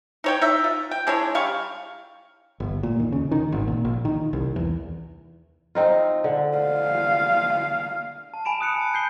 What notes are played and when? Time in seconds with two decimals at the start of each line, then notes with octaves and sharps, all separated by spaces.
0.24 D#4 C#5 G5
0.41 D#4 E5
0.64 F4
0.91 G5
1.07 G#3 D4 E4 C#5
1.35 G3 F5 C#6
2.60 G1
2.83 A#2
2.99 D#2
3.12 C#3
3.31 D#3
3.52 G#1
3.68 A#2
3.85 A#1
4.05 D#3
4.33 C2
4.56 E2
5.75 C4 D#4 F4
6.24 D3
6.58 F5
8.34 A5
8.45 G#5 B5 D7 E7
8.61 D#6 F#6 C#7
8.76 A5 C#7
8.94 G6 C7 G7